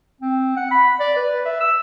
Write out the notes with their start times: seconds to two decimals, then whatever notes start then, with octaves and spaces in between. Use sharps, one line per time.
0.21 C4
0.57 F#5
0.71 B5
1.00 D5
1.16 B4
1.45 E5
1.60 E6